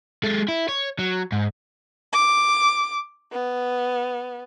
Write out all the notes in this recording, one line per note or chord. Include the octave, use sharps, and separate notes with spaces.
G#3 A4
E4
C#5
F#3
G#2
D6
B3